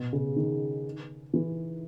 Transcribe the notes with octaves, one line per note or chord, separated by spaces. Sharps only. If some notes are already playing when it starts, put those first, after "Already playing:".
Already playing: B2
C#3
D#3
E3